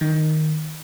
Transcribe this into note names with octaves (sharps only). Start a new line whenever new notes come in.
D#3